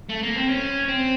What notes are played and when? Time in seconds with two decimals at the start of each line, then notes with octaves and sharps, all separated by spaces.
0.09 A3
0.23 A#3
0.36 C4
0.49 C#4
0.88 C4